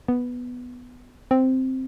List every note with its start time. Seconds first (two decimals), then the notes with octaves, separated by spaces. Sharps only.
0.08 B3
1.31 C4